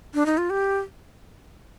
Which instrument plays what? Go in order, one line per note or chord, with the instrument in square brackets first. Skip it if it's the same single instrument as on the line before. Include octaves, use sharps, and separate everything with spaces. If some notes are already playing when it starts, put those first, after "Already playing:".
[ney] D4
D#4
F4
G4